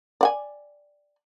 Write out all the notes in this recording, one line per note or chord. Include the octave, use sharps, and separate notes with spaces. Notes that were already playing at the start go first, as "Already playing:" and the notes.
D5 F#5 G#5